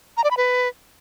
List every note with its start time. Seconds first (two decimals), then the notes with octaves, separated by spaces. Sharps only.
0.17 A#5
0.24 D5
0.31 B5
0.37 B4